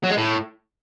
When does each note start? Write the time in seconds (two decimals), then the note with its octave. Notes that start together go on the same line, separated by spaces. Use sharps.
0.04 F#3
0.10 G#3
0.17 A2